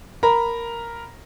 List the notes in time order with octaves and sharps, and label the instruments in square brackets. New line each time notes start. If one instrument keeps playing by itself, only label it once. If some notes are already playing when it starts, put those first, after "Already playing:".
[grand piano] A#4 A#5 B5